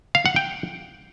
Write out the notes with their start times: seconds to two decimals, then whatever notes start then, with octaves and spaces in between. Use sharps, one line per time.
0.15 F5
0.26 F#5
0.36 G5